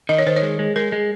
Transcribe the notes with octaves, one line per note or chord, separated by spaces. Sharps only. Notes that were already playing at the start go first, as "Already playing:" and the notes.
D#3 D#5
C#5
D#3 C5
C#5
G#3
G#3
G#3 A#4
G#3